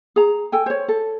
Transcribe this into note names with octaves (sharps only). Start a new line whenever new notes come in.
G#4 A#5
A4 G5 G#5
C5 C#5
A4